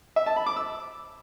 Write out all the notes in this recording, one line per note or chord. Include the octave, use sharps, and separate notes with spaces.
E5
A5
B5
D6
E6